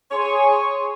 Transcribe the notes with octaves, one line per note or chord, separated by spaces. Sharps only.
G#4 C#5 G#5 C6